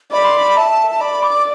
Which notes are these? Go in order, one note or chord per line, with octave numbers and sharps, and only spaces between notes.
D5 B5
C6
B5
E5 A5
A5
D5 B5
D6